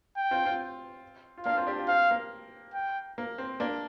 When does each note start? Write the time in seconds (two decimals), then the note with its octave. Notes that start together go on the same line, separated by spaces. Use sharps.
0.17 G5
0.31 C4 F4
0.45 C4 F4
1.37 F4
1.45 A#3 D4 F5
1.57 C4 F4
1.67 D4 G4
1.78 C4 F4
1.88 C4 F5
2.11 A#3
2.74 G5
3.18 A#3
3.38 C4
3.60 A#3 D4